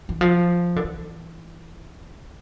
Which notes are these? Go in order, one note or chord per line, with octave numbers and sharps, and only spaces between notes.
E3
F3
D3
E3